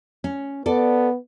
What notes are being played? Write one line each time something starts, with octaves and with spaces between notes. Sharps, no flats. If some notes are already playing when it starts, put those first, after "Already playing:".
C#4
B3 A4 D5